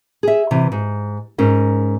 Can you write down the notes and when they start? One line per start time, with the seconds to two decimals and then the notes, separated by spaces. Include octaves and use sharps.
0.23 G#4 E5
0.51 C3 E3
0.72 G#2
1.38 G#2 C#4 A#4